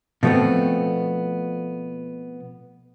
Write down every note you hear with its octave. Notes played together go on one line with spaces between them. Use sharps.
B2 F3 A3 B3 C4